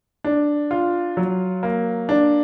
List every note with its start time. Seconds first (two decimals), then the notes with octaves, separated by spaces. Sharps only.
0.24 D4
0.71 F4
1.17 F#3
1.63 A#3
2.09 D4